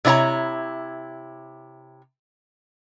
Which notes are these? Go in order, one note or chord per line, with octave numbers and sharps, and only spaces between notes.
C3 D4 E4 C#5 A#5